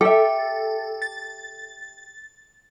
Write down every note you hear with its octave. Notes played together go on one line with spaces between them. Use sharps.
G4 A4 E5
A6